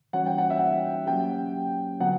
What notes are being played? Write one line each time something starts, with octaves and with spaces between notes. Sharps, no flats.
E3 G3 C#4 F#4 C#5 F#5
G5
F#5
E5
F#5
F#3 A#3 C#4 G4 G5
D3 F#3 B3 F#5